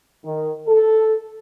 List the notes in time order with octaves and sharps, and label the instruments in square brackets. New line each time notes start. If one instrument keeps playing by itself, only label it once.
[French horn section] D#3
A4